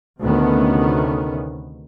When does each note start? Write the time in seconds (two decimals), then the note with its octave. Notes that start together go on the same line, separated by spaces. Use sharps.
0.21 D2 C3 D#3 A3 B3 C#4